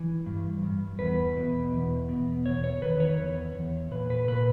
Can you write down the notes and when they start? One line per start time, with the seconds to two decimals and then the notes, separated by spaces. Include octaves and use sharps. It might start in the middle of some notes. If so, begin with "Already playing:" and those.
Already playing: E3
0.26 G2
0.63 G2
0.99 E2 B4
1.37 B2
1.72 E2
2.09 B2
2.45 E2 C#5
2.64 C#5
2.82 D#3 B4
3.00 C#5
3.18 E2
3.55 E2
3.91 A#2 B4
4.10 B4
4.28 A#2 B4